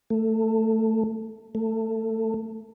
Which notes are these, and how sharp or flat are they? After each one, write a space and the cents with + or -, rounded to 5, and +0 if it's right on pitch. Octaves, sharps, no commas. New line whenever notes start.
A3 +15
A3 +20